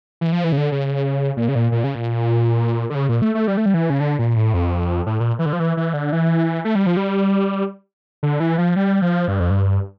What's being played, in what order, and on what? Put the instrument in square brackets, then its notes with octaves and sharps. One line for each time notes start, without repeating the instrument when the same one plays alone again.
[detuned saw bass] E3
F3
E3
C#3
D3
C#3
A#2
C#3
A#2
A#2
C#3
A#2
D3
C#3
A#2
A3
A3
G3
A3
G3
E3
C#3
D3
A#2
A2
F2
A2
A#2
E3
D3
F3
E3
E3
D3
E3
A3
G3
F3
G3
D3
E3
F3
G3
F3
G2
F2
G2